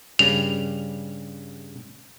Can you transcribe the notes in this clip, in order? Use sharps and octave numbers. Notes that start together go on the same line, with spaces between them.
G2 C#3 G3 F7